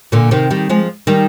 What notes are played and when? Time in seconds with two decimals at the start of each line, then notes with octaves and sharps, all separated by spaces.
0.12 A#2 D3
0.31 C3 D#3
0.50 D#3 G3
0.70 F3 G#3
1.07 D#3 G3